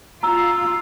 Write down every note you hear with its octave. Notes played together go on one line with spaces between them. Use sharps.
F4 A#5 E6